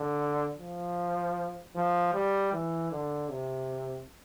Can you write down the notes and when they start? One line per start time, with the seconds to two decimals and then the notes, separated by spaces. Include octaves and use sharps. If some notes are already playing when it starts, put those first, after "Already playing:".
Already playing: D3
0.59 F3
1.75 F3
2.14 G3
2.53 E3
2.91 D3
3.30 C3